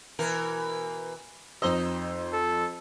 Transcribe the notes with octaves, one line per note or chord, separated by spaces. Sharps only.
B2 E3 A#4
F2 D#4 C5 D#5 E6
A4